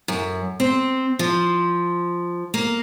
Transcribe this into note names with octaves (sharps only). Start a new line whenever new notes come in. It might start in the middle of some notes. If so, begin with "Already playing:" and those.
F#2
C4
F3
A#3